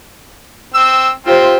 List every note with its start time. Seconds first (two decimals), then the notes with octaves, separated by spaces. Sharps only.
0.74 C4 E6
1.26 C4 F4 G4 C5